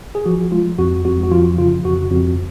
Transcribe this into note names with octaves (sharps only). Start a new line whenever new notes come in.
G#4
F3 F#4
G#3 F4
F2 F#4
F2 F#4
F#4
F3 F4
C#3 F4
F2 F#4
F2 F#4